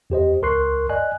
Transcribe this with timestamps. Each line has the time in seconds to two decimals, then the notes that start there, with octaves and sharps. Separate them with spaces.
0.10 E2 G4 C5 D#5
0.42 C#2 A#4 C6 C#6 F#6 C7
0.89 D5 D#5 G#5 F#6